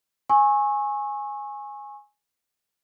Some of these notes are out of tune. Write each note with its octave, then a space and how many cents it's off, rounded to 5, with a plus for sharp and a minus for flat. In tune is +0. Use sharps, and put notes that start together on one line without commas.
G#5 +0 C#6 -30 E6 -25